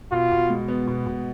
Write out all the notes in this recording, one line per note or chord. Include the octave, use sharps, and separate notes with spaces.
B2 F4
B2
G#3
B3
B2
B2